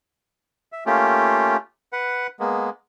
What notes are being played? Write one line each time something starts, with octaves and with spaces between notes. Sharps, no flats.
E5
A3 A#3 C#4 F4 G4
B4 F#5
G#3 A#3 B3